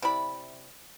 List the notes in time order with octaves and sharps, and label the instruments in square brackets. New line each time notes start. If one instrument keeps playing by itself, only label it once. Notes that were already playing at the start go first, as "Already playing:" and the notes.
[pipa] C3 E4 D5 B5